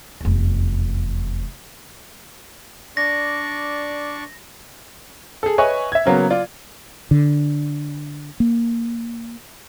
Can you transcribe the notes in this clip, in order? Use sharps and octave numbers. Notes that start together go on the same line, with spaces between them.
F1 E2
D4 D5 C#6 A#6
G#4 A4
B4 C#5 D#5 E5 G#5 C#6
E5 G#6
C#3 F#3 A#3 B3
F4 D5
D3
A#3